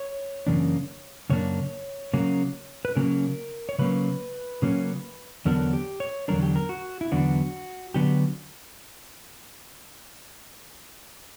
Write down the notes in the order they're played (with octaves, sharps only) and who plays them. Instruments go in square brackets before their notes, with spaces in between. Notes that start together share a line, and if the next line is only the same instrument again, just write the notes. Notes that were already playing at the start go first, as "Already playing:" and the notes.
Already playing: [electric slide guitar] C#5
F#2 C#3 E3 A#3 D4
F#2 C#3 A#3 D4 C#5
C#3 F#3 A#3 C#4
B4
C#3 F#3 A#3 C#4 A#4
C#5
C#3 F#3 A#3 C#4 B4
C#3 F#3 A#3 C#4
E2 D3 F#3 B3 D4 A#4
G4
C#5
E2 D3 F#3 B3 D4 A#4
G4
A#4
F#4
E4
E2 D3 F#3 B3 D4 F#4
D3 F#3 B3 D4 G4